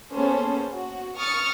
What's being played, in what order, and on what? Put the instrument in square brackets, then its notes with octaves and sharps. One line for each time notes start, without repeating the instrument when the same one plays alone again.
[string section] A#3 B3 C#4 G#4 A4 C5
F#4
C#6 D#6 F6 A6 C#7